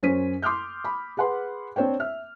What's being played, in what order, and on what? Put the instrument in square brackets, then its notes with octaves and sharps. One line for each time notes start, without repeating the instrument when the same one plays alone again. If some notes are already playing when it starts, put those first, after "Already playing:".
[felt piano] F#2 C#4 C5 B6 D#7
C6 D6 D#6 F6 G6
B5
G#4 B4 F#5 B5 C6
C4 D4 C5 C#5 G5
E5 F6